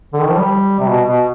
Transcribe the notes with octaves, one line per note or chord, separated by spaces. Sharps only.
D3
D#3
F3
G3
C3
B2
B2